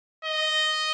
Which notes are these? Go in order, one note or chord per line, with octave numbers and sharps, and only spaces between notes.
D#5